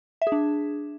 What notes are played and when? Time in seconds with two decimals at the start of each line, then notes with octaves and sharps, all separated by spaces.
0.22 E5
0.27 G#4
0.32 D4